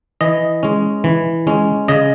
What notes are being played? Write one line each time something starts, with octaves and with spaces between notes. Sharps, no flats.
E3 D#5
G#3 C#4
E3
G#3 C#4
C#3 D#5